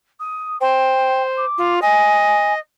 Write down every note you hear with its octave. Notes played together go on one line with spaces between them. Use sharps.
D#6
C5 G5
D6
F4
D#5 G#5